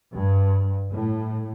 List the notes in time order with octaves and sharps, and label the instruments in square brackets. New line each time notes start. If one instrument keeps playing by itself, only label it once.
[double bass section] G2
A2